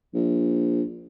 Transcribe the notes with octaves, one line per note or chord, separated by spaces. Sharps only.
A#1